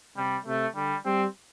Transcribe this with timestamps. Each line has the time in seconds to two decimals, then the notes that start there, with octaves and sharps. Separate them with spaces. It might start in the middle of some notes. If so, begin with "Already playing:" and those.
0.17 C3 G3
0.46 C3 A3
0.75 D3 G3
1.05 G3 C4